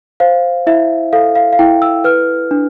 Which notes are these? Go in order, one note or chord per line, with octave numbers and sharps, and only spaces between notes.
C5 F5
E4 E5
A4 F5
F5
F5
E4 G5
E6
B4 F6
D4